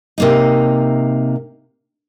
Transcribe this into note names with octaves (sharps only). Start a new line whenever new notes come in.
C3 A#3 D#4